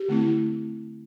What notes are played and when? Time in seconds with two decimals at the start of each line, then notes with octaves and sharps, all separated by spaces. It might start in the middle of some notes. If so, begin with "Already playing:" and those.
Already playing: G4
0.08 D3 A3 C4 E4